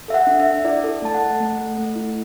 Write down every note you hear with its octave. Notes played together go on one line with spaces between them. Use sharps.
A4 E5
F#5
D4
E5
D4
E4 D5
A4
A3 A5
F#5
A4
A3
A4
A3
E4